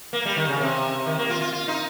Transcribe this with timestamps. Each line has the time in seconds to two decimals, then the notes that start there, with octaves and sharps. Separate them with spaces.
0.13 A#3
0.26 G3
0.37 D#3
0.48 C#3
0.60 C3
1.06 D#3
1.18 A#3
1.30 F4
1.41 F4
1.53 F4
1.68 D#4